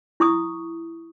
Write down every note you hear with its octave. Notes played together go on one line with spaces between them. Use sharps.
E4 C#6 D#6